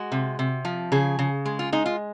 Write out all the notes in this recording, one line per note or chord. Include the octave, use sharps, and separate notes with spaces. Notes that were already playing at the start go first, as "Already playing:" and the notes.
Already playing: G#3 F#4
C3
C3
F3
C#3 G#4
C#3
G#3
F4
G#3 D#4
F4